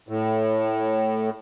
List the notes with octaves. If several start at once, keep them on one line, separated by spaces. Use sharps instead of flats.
A2